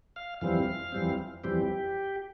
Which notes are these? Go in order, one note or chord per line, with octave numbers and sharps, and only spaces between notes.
F5
F2 E3 G3 C4 F5
F2 E3 G3 C4
F2 E3 G3 C4 G4